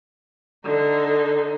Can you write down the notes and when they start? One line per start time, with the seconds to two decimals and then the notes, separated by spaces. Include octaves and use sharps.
0.64 D3 D#4